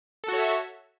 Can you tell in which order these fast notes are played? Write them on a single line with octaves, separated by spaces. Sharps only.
A4 F#4 C#5 E5